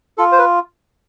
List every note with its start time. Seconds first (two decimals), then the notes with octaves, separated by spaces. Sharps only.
0.18 F4 A4
0.32 C5
0.39 B4